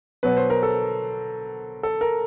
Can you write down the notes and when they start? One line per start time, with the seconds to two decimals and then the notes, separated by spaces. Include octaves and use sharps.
0.23 B2 F#3 B3 B4
0.37 C5
0.50 A#4
0.63 A4
1.83 A4
2.01 A#4